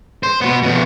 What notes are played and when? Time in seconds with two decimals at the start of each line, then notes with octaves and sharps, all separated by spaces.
0.23 C5
0.41 B2 B3
0.63 F2 B2